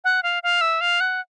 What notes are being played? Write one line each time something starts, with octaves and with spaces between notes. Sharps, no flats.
F#5
F5
F5
E5
F5
F#5